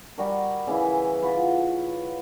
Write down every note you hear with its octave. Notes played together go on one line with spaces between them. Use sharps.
G3 F#4 A#4
C#3 E3 E4
F4 F#4 B4